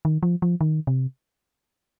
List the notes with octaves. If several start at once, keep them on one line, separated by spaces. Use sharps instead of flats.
D#3
F3
F3
D#3
C3